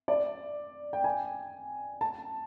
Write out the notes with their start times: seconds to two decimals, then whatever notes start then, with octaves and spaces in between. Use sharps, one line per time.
0.08 D5
0.93 G5
1.04 G#5
2.01 A5